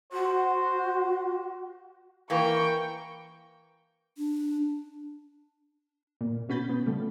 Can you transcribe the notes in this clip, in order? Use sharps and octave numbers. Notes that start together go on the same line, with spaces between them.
F#4 C5
E3 A#3 G5 C#6
D4
A#2
B2 C#4 F#4 B5 G6 A6
B3
C#3 F3 G3 A3